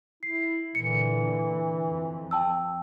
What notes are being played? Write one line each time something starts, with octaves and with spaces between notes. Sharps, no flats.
E4 C7
A#2 D3 E3 C#7
F2
G5 A5 E6